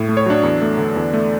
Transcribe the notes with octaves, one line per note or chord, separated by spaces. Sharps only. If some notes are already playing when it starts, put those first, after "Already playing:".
Already playing: A2
A3
C#5
F#3 D4
E2
A3
D3
E2
A3